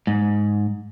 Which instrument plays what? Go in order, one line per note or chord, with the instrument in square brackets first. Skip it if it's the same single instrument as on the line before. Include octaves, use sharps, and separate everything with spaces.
[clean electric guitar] G#2